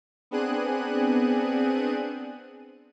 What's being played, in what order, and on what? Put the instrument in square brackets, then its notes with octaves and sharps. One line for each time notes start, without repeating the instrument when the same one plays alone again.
[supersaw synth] B3 C4 D4 G#4 F#6 D#7